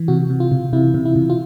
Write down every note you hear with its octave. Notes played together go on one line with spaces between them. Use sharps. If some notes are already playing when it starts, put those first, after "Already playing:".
Already playing: E3
C3 F#4
C3
F4
C3
C3 E4
C3
E4
C3
F4